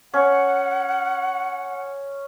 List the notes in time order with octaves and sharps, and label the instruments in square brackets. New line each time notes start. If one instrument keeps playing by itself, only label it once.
[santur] C#4 [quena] F#5